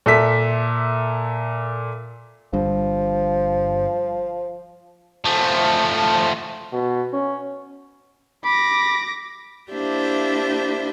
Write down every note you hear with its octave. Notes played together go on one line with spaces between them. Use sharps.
A#2 A4 E5 B6
G1 G2 F3
F3 A3
B2
C#4
B5 D6 A#6
A#3 D4 E4 G4 C5 E5